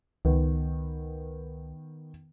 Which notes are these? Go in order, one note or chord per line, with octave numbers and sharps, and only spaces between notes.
C#2 D#3 B3